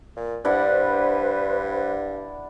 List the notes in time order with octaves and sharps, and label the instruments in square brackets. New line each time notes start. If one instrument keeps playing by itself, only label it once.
[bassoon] A#2
[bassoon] G2 [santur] D4 E4 F#5 [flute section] B4 C5